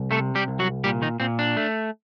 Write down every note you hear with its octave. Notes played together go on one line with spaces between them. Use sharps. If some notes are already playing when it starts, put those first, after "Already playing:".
Already playing: C2
C3 A3 A4
G3 G4
C2
F#3 F#4
A#2 G3 G4
D#3 D#4
A#2 C4
D4
A3